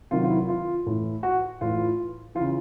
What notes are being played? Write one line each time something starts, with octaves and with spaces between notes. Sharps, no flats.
C3 D#3 F#3 F4
F4
E4
F4
A2 E3
F#4
A2 E3 F4
E3 F4
C#3